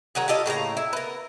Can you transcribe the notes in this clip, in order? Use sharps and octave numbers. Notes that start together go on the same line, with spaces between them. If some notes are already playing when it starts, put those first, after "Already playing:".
D#3 F#3 F#4 G#4
F4 G4 A4 D#5
A2 C#3 A#3 A#5
E4
B3 A#4